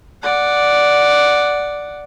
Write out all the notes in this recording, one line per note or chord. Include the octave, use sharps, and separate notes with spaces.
D5 F#5